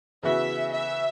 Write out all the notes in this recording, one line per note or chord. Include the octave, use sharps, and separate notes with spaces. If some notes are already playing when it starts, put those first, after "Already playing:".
C#3 E3 B3 F#4 E5
E5